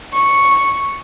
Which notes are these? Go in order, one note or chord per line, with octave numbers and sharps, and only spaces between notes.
C#6